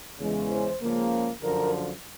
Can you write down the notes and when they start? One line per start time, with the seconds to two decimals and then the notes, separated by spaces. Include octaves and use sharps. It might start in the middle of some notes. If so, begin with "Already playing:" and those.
0.19 E2 C#3 E3 G#3 C#4
0.50 C5
0.81 C#2 C#3 F3 A#3
1.42 F#2 D3 F3 A#4